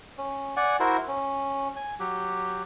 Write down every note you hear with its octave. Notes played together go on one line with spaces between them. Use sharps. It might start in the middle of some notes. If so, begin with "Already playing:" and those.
C#4
D5 F#5 G#5
E4 F#4 A#4 C5
C#4
G#5
F#3 G4